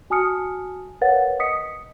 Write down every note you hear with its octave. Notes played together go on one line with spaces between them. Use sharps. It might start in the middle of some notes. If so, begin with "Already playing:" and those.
F#4 G#5 A5 D#6 F6 C#7
A#4 B4 C#5 F5 F#5 A6
D#5 D#6 B6 C#7